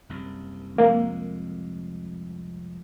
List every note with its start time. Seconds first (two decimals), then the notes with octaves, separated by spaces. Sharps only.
0.09 F#1 C2
0.78 C2 F2 G#3 A#3